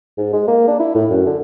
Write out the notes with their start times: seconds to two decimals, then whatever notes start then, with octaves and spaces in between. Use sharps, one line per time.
0.18 G#2
0.33 G#3
0.48 A#3
0.68 D4
0.80 E4
0.95 A2
1.11 F#2
1.26 D3